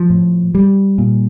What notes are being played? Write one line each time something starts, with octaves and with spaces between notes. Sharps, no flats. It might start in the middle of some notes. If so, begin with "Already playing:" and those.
Already playing: F3
A2
G3
A#2